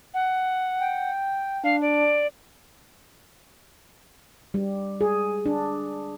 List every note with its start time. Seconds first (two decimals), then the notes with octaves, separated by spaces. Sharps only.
0.14 F#5
0.80 G5
1.64 D4 F5
1.81 D5
4.54 G3
5.01 G#4
5.46 D4